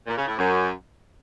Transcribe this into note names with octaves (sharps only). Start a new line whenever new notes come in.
A#2
C#3
A2
F#2